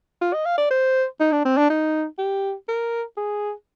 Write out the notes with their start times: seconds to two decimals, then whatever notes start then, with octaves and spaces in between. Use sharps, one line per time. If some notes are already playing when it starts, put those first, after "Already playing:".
0.22 F4
0.34 D#5
0.45 F5
0.58 D5
0.70 C5
1.20 D#4
1.32 D4
1.45 C4
1.57 D4
1.70 D#4
2.18 G4
2.68 A#4
3.17 G#4